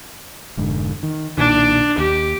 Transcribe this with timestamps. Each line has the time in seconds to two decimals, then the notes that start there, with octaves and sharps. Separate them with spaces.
0.57 F1 G#2 D3
1.03 D#3
1.38 B1 A#2 D#3 D4
1.98 D#2 G4